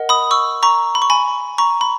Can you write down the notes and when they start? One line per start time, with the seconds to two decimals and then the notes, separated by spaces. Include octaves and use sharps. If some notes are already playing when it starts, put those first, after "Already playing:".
Already playing: A#4 D#5 F#5
0.09 B5 D#6
0.31 C#6 E6
0.63 A#5 C#6
0.95 B5
1.02 C#6
1.10 G#5 B5
1.58 A#5 C#6
1.81 B5